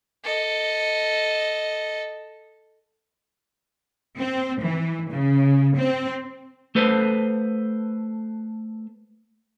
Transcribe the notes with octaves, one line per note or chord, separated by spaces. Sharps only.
A4 D#5
C4
E3
C#3
C4
A3 A4 B4 C5